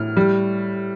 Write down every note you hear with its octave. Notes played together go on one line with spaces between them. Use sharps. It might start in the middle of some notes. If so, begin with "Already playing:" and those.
Already playing: A2 F6
G3